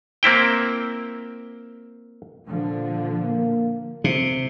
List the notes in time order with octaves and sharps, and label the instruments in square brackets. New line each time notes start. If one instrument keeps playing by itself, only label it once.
[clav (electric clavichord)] A#3 C4 E4 G5
[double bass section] A#2 D3 F3
[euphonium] A#3
[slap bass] C3